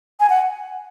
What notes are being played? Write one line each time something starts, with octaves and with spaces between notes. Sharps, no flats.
G#5
F#5